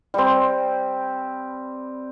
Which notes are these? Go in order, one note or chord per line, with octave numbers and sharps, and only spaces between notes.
G3 C4